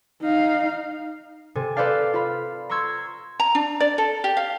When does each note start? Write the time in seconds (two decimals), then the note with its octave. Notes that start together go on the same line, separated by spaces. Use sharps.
0.22 D#4 F5
1.55 C3 A4 G#5
1.76 A4 B4 C5 D5 F5 A5
2.14 F4 F5 B5
2.69 A#5 C6 C#6 E6 G#6
3.40 A#5
3.55 D4
3.80 D5
3.98 A4
4.24 G4
4.37 F5